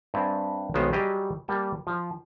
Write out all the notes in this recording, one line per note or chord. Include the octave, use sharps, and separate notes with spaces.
G2 C4 D5 E5 G#5
B1 D#3 G#3 B3 C5 G#5
F#3 G3 G4 G#4 D#5
G3 A#3 G5 A5
F3